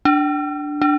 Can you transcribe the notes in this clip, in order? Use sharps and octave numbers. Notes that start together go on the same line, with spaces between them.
D4
D4